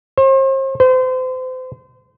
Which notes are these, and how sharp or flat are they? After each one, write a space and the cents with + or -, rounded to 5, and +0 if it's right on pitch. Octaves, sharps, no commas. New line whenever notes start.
C5 +40
C5 -35